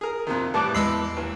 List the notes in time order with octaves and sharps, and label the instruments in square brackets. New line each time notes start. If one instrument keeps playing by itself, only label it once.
[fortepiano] G#4 A#4
F2 C3 D#3
[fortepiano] A2 E3 G3 [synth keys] A5 D6 F#6
[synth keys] E2 [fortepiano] E3 B5 [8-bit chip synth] G#3 E6 C7
[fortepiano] D#2 E3